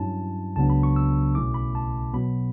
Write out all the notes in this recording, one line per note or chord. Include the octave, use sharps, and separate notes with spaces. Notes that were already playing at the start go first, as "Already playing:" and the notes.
Already playing: G2 F#3 C#4 E4 A5
C#2 C#3 F#3 B3 D4 A5
B5
C#6
E6
B1 B2 A3 C#4 E4 D6
B5
A5
B2 F#3 B3 B5